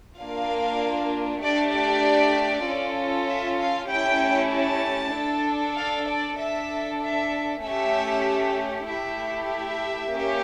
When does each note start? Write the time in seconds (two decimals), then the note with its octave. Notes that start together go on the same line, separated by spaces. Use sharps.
0.18 A#3 D4 F4 F5
1.42 A3 D4 G4 D5
1.74 D5
2.66 C#4 F4 A4
3.28 E5
3.60 F5
3.91 A3 C#4 E4 G4 G5
4.52 A5
5.15 D4 A4
5.77 F5
6.08 D5
6.39 D4 A4 E5
7.01 E5
7.63 A3 C#4 G4 E5
8.87 A3 E4 G4 E5
9.49 E5
10.12 A#3 C#4 G4